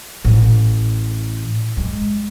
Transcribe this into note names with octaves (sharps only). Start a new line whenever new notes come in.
A1
G#3